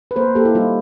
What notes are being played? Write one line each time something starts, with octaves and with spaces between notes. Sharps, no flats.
B4
A#3 A#4 C5
A#3 G4 A4
E4
G3 D#4 F4